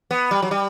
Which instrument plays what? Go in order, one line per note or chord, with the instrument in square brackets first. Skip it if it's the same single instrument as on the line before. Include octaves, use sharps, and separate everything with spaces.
[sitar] B3
G3
F#3
G3